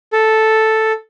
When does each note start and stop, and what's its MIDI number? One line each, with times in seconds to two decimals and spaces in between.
0.13 0.92 69